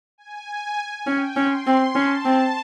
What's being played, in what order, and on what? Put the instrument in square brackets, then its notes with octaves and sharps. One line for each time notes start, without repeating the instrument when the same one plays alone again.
[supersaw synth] G#5
[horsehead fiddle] C#4 [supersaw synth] G5
[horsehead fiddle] C#4 [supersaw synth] C6
[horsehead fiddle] C4
[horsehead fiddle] C#4 [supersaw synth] A5
[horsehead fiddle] C4